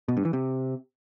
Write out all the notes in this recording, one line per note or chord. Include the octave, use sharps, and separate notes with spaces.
B2
G2
E3
C3